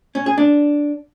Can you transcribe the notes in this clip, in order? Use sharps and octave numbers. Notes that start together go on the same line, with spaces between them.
C#4
G#4
D4